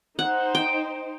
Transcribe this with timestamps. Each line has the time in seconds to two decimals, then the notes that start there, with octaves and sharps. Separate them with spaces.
0.19 D#4 C5 F#5
0.55 G5